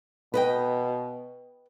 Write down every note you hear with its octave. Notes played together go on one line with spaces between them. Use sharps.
B2 B4 D#5 G5